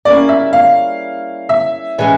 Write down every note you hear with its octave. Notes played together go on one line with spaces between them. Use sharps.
G3 A#3 C#4 E4 G#4 D5
E5
F5
E5
A2 E3 G#3 C#4